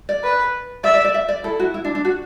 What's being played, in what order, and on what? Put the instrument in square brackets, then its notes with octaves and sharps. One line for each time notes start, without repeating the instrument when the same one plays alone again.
[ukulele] D5
[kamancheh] B4
[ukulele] D5 [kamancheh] E5
[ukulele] D5
D5
E5
D5
[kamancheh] E4 [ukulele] A4
[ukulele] F#4
E4
D4
D4
F#4